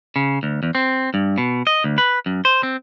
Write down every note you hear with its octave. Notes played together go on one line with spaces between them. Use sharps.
C#3
D2
E2
C4
G2
B2
D#5
D2
B4
F#2
C5
C4